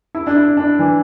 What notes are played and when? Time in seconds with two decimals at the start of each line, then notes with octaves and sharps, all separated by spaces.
0.15 E4
0.27 D4
0.35 E4
0.57 D4
0.79 E3